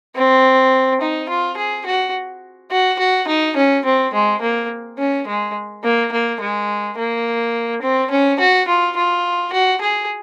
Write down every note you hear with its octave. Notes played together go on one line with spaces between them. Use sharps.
C4
D#4
F4
G#4
F#4
F#4
F#4
D#4
C#4
C4
G#3
A#3
C#4
G#3
A#3
A#3
G#3
A#3
C4
C#4
F#4
F4
F4
F#4
G#4